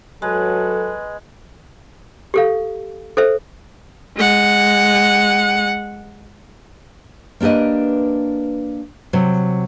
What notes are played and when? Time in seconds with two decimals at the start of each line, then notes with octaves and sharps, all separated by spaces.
0.22 F#3 G#3 A4 B4
2.34 G4 A4 F5
3.17 A4 C5 E5
4.17 G#3 F#5
7.40 A#3 D4 G4 B4 D#5
9.13 C3 F#3